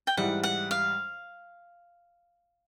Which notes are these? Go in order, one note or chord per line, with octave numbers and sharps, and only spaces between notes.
G5
G#2 E3 G3 F#5
F#5
F5